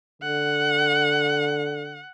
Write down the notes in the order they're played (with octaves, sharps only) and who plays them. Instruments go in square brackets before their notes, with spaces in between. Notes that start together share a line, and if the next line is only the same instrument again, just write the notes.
[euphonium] D3 [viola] F#5